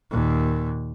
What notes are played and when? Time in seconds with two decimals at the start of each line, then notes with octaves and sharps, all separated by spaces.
0.11 D#2 A#2